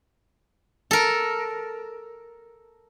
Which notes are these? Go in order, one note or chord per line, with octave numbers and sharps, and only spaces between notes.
A4 A#4